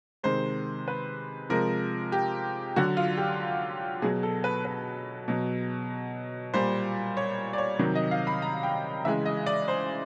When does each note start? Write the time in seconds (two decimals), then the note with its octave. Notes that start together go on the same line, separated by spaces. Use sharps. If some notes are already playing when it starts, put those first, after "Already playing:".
0.23 C3 D#3 G#3 C5
0.88 B4
1.49 C3 F3 G#3 A#4
2.12 G4
2.76 D3 F#3 F#4
2.97 F4
3.17 G4
4.02 B2 F#3 G#4
4.23 A4
4.44 B4
4.65 B4
5.28 B2 F#3
6.54 A#2 G3 C5
7.17 C#5
7.53 D5
7.58 C#5
7.79 C3 D#3 F#3
7.95 D#5
8.11 F5
8.27 B5
8.42 A#5
8.63 G5
9.05 C#3 E3 G#3 E5
9.26 D#5
9.46 D5
9.68 C5